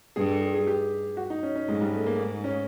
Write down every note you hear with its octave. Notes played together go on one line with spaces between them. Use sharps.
G2 G#4
A4
G#4
G#4
G4
F#4
D#4
C#4
C#4
G#2 G#3
G3
A3
A#3
C#4